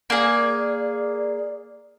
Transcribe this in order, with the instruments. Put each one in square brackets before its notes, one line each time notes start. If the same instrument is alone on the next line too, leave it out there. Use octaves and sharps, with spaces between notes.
[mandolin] A#3 G#4 [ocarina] D5